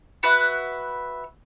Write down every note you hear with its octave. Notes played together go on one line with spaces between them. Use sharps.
F#4 B4 E5 F#5